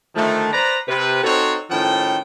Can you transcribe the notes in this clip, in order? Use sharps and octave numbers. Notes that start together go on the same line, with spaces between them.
D3 D#3 F3 A3
B4 C5 D5 A#5
C3 B4
C4 D#4 F#4 A4 C5 C#5
A2 D#3 F3 C#4 A4 G5